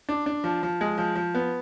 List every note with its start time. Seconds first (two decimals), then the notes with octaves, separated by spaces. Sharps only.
0.09 D4
0.26 D4
0.44 F3
0.63 F3
0.81 G#3
0.98 F3
1.15 F3
1.35 B3